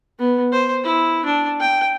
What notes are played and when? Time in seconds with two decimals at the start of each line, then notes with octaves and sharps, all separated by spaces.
0.19 B3
0.52 C5
0.84 E4
1.25 D4
1.60 G5